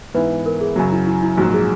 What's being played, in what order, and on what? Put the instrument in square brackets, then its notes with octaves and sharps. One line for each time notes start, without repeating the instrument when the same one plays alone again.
[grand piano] G#2 E3 B3 E4 [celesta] B4
[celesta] A#4
G#4
[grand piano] F#2 C#3 F#3 [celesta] F#4
[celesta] E4
E4
E4
[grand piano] A#1 G#2 F#3 [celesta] F#4
[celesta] G#4